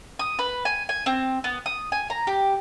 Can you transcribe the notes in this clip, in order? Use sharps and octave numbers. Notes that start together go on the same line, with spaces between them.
D#6
B4
G#5
G#5
C4
B3
D#6
G#5
A#5
G4